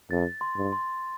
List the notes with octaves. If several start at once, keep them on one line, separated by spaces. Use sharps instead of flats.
F2 A6
C6
G2
C6